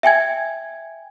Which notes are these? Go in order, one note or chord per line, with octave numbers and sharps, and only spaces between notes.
E5 G5 G#5 G#6